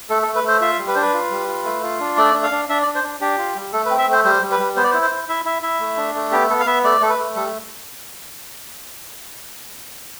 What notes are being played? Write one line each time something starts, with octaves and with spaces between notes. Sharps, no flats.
A3 A4
A4
A3
B4
A3 C5
F4 E5
G3
B4
D4 C5
B4
F4
G3
F4
A3
F4
D4
A3 D5
D4
F5
D4
D4 E5
D5
D4
C5
D4
D4 G4
F4
G3
A3 A4
B4
C4
E5
A3 C5
G3 C5
G3
B4
G3
B3 C5
D5
C5
E4
C5
E4
E4 E5
E4 E5
E4 E5
A3
D4
A3
B3 G4
B3 A4
F5
B3 E5
A3 D5
A3 A4
B4
A3
G3 A4